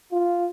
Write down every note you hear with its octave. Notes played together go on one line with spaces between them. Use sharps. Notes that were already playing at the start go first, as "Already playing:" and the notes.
F4